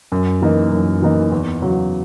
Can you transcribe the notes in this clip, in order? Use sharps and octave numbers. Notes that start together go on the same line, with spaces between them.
F#2
E3 A#3 D#4
F#2
E3 A#3 D#4
E2
C#3 F#3